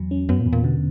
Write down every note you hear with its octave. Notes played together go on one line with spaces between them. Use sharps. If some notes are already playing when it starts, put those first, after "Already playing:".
Already playing: E2 F#3
C#4
F#2 B3
A#2
E2
A#2
B2 D3